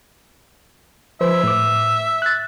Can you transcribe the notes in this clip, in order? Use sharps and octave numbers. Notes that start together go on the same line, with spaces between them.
F3 B4 C5 E5
A2 D6
F#6 A6